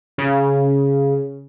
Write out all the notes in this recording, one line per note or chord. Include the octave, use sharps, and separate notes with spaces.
C#3